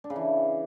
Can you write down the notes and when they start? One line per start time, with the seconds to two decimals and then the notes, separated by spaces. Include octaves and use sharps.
0.04 D4
0.10 C#3
0.16 E3